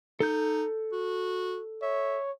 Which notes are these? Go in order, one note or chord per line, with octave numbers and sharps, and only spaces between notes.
D#4 A4 G6
F#4
C#5 E5